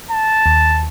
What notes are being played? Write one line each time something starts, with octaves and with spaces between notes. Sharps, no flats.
A5
D#2